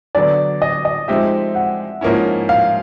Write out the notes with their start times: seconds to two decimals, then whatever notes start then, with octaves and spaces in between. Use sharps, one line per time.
0.15 D3 F#3 B3 D5
0.62 D#5
0.85 D#5
1.08 F3 G#3 C4 D#4 G4 E5
1.55 F#5
2.01 G#2 F3 A#3 C#4 E4
2.49 F5